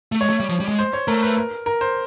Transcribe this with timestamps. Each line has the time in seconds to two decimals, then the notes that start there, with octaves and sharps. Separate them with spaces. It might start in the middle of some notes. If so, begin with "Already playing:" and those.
0.12 A3
0.21 G#3 C#5
0.30 A3
0.40 G3
0.49 F3
0.60 G3
0.68 G#3
0.79 C5
0.93 C#5
1.08 A3 A#4
1.23 B4
1.37 A#4
1.66 A#4
1.81 C5